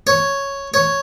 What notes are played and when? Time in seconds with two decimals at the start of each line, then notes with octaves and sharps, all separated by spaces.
0.07 C#5
0.74 C#5